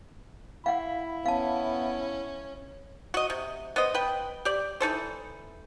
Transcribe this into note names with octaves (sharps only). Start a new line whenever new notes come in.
E4 F5 F#5 B5
B3 C#4 F5 A5
F#4 D#5
C3
B3 C5 D#5
B4 G5
G4 D5
E3 D#4 A4 C5